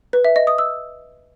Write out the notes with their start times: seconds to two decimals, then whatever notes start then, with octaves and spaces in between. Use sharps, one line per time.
0.13 B4
0.25 E5
0.36 D#5
0.47 D#6
0.58 E6